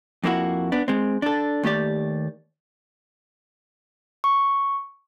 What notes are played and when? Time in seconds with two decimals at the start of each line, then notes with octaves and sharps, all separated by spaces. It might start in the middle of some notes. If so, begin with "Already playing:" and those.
0.24 F2 A#3 E4 F#4
0.72 B3 D4
0.88 G#3 C4
1.22 D4 A4
1.63 D#2 A3 G4 D5
4.24 C#6